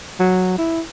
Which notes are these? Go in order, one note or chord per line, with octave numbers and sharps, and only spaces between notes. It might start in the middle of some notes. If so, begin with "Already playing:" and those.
F#3
E4